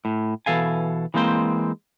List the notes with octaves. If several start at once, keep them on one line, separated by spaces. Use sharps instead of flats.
A2
B2 E3 A4 F5 G#5
E3 G#3 A#3 C4 C5